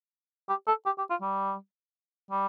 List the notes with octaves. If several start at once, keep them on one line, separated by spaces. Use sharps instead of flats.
G4
A4
G4
G4
F4
G3
G3